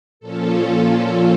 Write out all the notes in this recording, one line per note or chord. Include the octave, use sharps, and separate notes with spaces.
A#2 F3 C#4 F4 A4